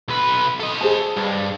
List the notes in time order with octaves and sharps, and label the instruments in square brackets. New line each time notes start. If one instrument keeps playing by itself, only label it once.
[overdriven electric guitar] B1 B4
A4 D#5
[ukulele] G#4 C5 A5
[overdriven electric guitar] G2